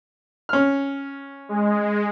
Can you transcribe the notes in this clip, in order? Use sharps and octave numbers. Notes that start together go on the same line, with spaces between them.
C#4 F6
G#3